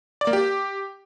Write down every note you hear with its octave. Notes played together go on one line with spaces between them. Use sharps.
D5
A#3
G4